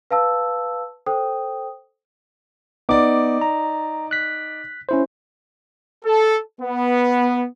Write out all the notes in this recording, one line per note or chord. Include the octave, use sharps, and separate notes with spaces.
B4 F5 A5 E6
A4 C5 G5 D#6
B3 D#4 D5 D6
A#5
F#6 B6
C#4 E4 C5
A4
B3